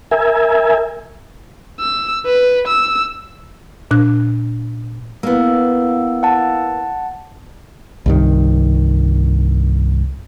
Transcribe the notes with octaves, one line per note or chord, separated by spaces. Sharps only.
A#4 E5 G#5
E6
B4
E6
A#2 D4 F#6
A#3 B3 E4 F5 E6
F#5 A5
C2 G2 D#3